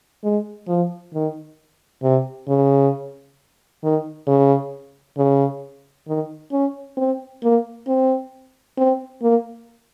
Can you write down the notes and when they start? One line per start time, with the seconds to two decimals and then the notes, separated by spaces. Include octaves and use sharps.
0.24 G#3
0.68 F3
1.14 D#3
2.03 C3
2.48 C#3
3.83 D#3
4.27 C#3
5.18 C#3
6.07 D#3
6.52 C#4
6.97 C4
7.43 A#3
7.87 C4
8.78 C4
9.22 A#3